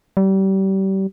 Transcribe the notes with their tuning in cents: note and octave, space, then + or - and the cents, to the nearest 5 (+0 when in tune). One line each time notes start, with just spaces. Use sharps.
G3 -30